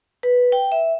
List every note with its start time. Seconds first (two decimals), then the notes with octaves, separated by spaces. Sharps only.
0.23 B4
0.52 G5
0.72 E5